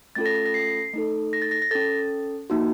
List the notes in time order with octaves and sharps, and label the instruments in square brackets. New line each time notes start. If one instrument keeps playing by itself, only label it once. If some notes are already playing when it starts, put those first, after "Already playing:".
[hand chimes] A3 C#4 F4 A4 A6
A#6
A#6
A#6
C7
A3 D#4 A4
A#6
A6
A#6
A#6
C#4 A4 A6
A#3 D#4 F#4